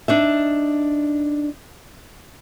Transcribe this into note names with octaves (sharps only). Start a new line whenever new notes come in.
D4 D#4 E5